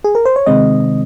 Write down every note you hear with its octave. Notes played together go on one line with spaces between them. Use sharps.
G#4
A#4
C5
C#5
C3 D#3 G#3 C4 D#5